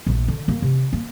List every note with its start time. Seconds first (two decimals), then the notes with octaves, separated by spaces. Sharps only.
0.07 A#1 A3
0.28 D3
0.48 F#2 A#3
0.62 C3
0.93 A#3